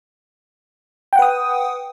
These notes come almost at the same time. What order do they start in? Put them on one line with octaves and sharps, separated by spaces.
G5 F#5 B4 D#6